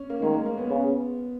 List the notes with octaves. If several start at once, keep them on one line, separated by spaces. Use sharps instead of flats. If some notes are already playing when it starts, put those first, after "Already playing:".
Already playing: C#4
A#3
D#3 G#3
G#3
A#3
B3
C#3 B3